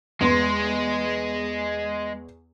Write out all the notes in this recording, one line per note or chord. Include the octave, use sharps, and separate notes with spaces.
E2 G#3 B3 C6